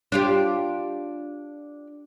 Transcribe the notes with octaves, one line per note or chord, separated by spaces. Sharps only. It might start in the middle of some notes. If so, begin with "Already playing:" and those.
D4 F4 G4